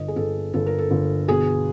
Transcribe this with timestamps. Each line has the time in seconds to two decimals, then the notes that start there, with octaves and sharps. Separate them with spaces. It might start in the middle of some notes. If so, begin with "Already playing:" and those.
Already playing: G1 D#5
0.08 G#4
0.16 G1 A4
0.53 G1 A4
0.66 A#4
0.78 A4
0.91 G1
1.28 B2 G#4